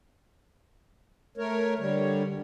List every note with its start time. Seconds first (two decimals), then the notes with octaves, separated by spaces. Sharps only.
1.37 A3 A#4 C#5
1.79 D3 G3 C#5